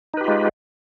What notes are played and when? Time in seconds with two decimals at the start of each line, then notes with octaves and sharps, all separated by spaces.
0.14 D#4
0.17 B4
0.21 G4
0.24 F4
0.28 G#3